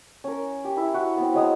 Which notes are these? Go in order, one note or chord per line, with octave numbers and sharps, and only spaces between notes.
C#4 A#4
G4
E4 E5
F#4
B3 C4
F#3 G#3 D#6 E6